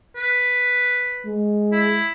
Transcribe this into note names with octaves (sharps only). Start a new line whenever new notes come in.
B4
G#3
E4